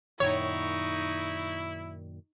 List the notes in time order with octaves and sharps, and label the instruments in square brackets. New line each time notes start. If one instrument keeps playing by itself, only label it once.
[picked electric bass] F#2 A#2 D#3 [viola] D#4 C#6 [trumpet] E4 [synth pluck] C#5